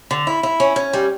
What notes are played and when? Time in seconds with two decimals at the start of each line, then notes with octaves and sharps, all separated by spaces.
0.11 D3
0.27 E4
0.43 E4
0.60 C#4
0.76 C#4
0.93 G3